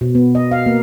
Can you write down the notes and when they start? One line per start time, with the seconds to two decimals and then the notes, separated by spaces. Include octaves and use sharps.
0.01 B2
0.15 B3
0.35 D#5
0.51 F5
0.66 A#3